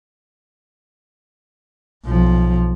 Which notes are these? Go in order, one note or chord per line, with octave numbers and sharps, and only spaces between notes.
B1 F3